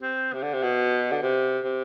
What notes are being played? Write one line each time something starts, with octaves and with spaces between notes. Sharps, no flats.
C4
C3
D3
C3
B2
D3
C3
C3